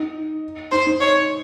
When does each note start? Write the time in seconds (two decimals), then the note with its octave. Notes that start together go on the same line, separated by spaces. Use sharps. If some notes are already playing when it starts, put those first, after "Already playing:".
Already playing: D#4
0.72 D#4 C5
0.87 D#4
1.01 C#5